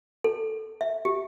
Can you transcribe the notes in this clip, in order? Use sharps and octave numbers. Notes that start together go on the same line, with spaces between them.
A4
E5
G4